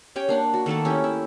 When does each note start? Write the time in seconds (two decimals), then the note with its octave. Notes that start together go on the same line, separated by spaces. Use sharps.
0.16 C#4 G4 C#5 G5
0.29 A#3 D4 F#5
0.54 F#4
0.66 D#3 A3 A#3 A4
0.85 C#4 E4 G4
1.04 E4